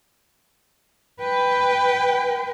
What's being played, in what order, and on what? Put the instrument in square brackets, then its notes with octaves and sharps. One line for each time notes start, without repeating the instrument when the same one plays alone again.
[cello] B4 G5